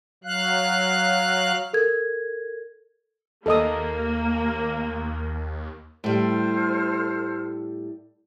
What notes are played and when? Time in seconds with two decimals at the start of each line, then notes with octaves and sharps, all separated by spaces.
0.24 F#3 F5 F#6
1.73 A4 A#4 G#6
3.46 D#2 A#3 A4 D#5 D#6
6.04 A2 G3 A4 C5 F6